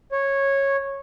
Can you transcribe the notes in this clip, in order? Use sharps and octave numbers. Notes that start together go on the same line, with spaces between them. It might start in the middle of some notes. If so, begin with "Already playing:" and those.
C#5